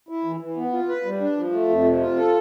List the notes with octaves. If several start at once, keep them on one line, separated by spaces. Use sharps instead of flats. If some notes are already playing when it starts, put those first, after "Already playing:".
E4
E3
E3
B3
F4
B4
G3
D4
F3
A3
F2
C3
F4
A4